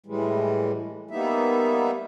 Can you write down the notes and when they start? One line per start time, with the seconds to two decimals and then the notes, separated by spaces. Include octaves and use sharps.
0.06 A2 E3 G3 G#3
1.11 G3 A#3 B3 D#4 E5